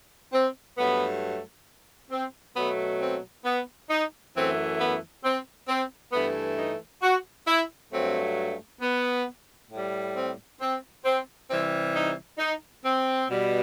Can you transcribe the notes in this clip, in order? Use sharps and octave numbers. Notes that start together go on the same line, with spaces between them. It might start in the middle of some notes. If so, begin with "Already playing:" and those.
C4
G2 F#3 A3 B3
C4
B2 F#3 A3 B3
C4
B3
D#4
F#2 E3 A3 C4
B3
C4
C4
G2 E3 A3 B3
D#4
F#4
E4
G2 F#3 A3 C4
B3
A2 G3
C4
C4
C4
C3 E3 G3 C4
D#4
D#4
C4
B2 G3